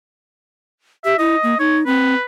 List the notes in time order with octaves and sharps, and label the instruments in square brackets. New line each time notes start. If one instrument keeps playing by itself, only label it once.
[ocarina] G4 [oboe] E5
[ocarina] E4 [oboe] D#5
[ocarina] A#3
[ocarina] D#4 [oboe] C#5
[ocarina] C4 [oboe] B4